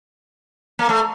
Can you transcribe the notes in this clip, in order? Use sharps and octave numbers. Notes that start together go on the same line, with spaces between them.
A#3
A3